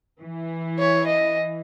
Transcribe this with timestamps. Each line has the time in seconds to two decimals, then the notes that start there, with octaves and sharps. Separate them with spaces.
0.21 E3
0.79 C#5
1.08 D#5